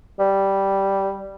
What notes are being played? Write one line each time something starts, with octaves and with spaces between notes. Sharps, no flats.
G3